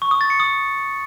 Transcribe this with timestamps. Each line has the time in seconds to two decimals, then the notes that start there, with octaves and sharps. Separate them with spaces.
0.02 C#6
0.11 D#6
0.21 A6
0.30 C#7
0.40 D#6